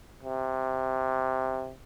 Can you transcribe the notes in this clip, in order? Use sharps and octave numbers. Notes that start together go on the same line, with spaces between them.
C3